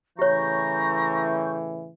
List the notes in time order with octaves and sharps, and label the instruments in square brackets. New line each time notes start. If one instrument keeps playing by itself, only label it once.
[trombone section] A2 C#3 E3 [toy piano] G4 C#5 [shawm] A#5 [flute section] C#6 G6